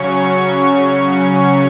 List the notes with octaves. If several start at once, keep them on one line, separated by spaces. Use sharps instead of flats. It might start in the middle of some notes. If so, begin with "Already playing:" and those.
Already playing: C#3 F#3 C#4 C#6